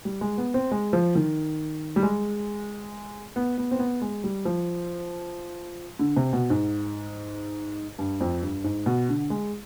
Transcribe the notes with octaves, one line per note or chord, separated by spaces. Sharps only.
G3
G#3
B3
C4
G#3
F3
D#3
G3
G#3
B3
B3
C4
B3
G#3
G3
F3
D3
C3
B2
G#2
G2
F2
G2
G#2
B2
D3
G#3